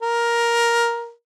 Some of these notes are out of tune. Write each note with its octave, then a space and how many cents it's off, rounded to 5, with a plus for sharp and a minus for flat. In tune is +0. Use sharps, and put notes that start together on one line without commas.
A#4 +10